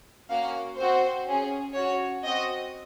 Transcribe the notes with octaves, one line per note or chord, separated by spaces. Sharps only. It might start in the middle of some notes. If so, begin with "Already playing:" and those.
A#3 C#4 F#4 F5
C4 F#4 C5
C#4 G#4
C#4 F#4 C#5
C4 F#4 D#5